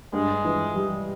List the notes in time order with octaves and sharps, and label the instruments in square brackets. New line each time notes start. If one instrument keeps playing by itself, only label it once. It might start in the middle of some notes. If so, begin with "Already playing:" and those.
[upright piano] G2 [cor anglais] G#3
[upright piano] E3
G3